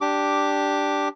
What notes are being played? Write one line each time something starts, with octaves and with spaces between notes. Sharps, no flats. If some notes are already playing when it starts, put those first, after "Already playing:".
D4 G4 D6